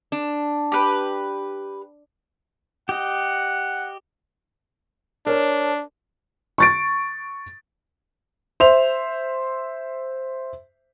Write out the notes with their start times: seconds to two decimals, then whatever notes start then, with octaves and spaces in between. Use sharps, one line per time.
0.12 D4
0.72 G4 B4
2.89 G4 D#5 F#5
5.26 D4 A#4 C#5 A5
6.58 C#6 A6 D7
8.60 C5 E5 F7